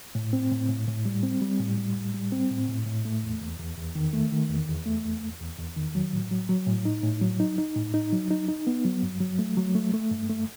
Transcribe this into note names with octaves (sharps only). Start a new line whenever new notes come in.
A2
C4
A2
A2
A2
G3
C4
G3
A2
G3
A2
G3
C4
A2
A2
A2
A3
E2
E2
E2
E2
D#3
A3
D#3
E2
E2
A3
E2
E2
E2
E2
D#3
F#3
A2
F#3
F#3
A2
D#4
A2
F#3
D#4
D#4
A2
D#4
F#3
D#4
D#4
B3
F#3
G2
F#3
A3
F#3
A3
A3
G2
A3